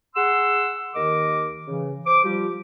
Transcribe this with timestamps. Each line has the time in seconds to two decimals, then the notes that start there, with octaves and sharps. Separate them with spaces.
0.16 G#4 F#5 C6 E6
0.95 D#2 D#3 A#4 D#5 D6
1.67 C#3 E3
2.06 C5 D6
2.24 F3 G3 G4